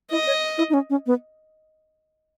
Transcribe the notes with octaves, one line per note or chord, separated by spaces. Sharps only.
E4 D#5
C#5
E4
D#4
C#4
C#4
B3